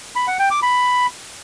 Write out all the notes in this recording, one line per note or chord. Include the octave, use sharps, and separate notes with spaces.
B5
F#5
G5
D6
B5